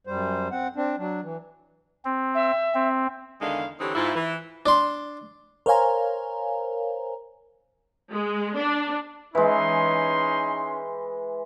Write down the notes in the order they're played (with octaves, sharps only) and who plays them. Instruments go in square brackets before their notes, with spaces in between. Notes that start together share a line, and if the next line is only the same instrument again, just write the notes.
[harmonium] F#2 G3 C5
C4 F#5
C4 D4
F#3 D4
E3
[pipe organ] C4
[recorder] E5
[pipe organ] C4
[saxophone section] E2 D3 D#3 G#3 F5
D3 E3 C4 D#4 G4 C#5
G#2 E4 F4
E3
[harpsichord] D4 C6
[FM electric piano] A#4 C5 C#5 F5 G#5 A#5
[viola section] G#3
D4
[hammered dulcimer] E3 G#3 [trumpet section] C#4 D#4 C6